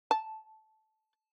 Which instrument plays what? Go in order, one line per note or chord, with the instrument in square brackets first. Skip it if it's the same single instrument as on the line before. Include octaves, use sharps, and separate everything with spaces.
[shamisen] A5